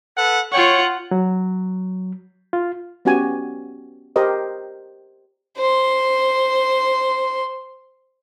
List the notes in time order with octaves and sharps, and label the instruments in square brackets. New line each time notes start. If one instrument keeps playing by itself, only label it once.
[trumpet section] A4 B4 F#5
[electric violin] F4 F#5 [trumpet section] C#5 G5 C#6
[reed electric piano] F#3
F4
[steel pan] B3 C#4 F#4 G4 G#5
G4 A#4 C5 D#5
[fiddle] C5 C6